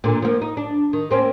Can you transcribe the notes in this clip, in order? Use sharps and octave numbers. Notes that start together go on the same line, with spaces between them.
A#2 D3
F3 A#3
D#4
D4
D#3
A#3 C4 C#4